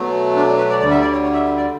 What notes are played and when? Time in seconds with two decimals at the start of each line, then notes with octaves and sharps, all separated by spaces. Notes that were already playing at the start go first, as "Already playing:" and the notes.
Already playing: B2 F#3 A3
0.36 D4
0.47 D4
0.57 B4
0.69 D5
0.79 D2 D3 G3 D5
0.91 E5
1.02 D5
1.12 C#5
1.23 C#5
1.33 E5
1.45 E5
1.56 D5